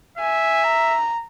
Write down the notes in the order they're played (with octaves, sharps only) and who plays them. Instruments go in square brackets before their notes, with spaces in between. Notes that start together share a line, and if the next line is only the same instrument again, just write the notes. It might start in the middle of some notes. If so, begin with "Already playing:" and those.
[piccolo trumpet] E5 [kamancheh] G#5
[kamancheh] A#5